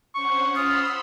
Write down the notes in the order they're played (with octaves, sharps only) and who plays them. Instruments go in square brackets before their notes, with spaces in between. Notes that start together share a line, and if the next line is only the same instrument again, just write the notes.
[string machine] C#4 C5 F#5 [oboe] C#6
[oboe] F4 [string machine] B5 C6 E6 [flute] D#6